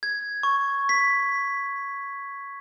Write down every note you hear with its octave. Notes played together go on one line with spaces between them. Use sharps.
G#6
C#6
B6